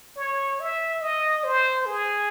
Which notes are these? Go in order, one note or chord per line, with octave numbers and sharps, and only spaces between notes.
C#5
E5
D#5
C5
G#4